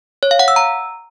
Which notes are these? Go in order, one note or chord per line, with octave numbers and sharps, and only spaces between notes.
C#5
F5
F#5
E6
A#5